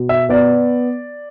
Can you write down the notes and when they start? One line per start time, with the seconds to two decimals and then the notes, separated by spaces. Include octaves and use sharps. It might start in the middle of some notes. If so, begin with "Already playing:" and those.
Already playing: B2
0.09 E5
0.29 B3 D5